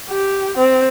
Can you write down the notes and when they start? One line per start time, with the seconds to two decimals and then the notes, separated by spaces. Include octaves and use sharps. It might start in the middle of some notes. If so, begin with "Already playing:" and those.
0.10 G4
0.57 C4